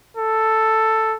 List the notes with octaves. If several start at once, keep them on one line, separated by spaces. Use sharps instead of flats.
A4